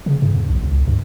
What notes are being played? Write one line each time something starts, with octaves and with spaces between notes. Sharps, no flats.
C#3
G2
E2
B1
C#2
G2